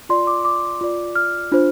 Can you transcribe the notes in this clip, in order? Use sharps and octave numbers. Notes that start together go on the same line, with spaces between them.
F4 D5 C6
D6
D6
F4 D5
F6
D4 F4 C5